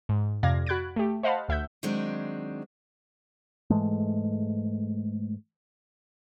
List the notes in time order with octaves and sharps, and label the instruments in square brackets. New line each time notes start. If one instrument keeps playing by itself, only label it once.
[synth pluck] G#2
F2 C3 D5 F5 G#6 A#6
F#4 B5 F#6 G#6 A6 D7
A3 G4
C5 D#5 F5 F#5 A5 B5
D2 E5 F#5 G6
[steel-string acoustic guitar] D#3 F#3 G#3 C4 D4
[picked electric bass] G#2 E3 G#3 A3